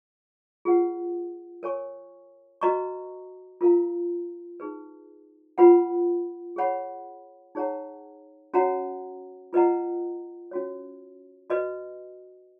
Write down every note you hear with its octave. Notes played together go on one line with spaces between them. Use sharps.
F4 G#4 B4 F#5
A#4 C#5 G#5 C#6
F#4 B4 D#5 A#5 C#6
F4 A#4 F5 A#5
D#4 G#4 B4
F4 B4 F#5 B5
G#4 C#5 F#5 B5
D#4 G#4 C#5 F#5 A#5
C#4 F#4 C#5 F#5 A#5
F4 B4 D#5 F#5 A#5
C#4 F#4 C#5
F#4 B4 D#5